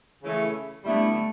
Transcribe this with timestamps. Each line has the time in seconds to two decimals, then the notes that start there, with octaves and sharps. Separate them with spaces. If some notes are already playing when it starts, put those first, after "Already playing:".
0.23 C#3 E3 A3
0.84 D3 G3 A3 B3 E4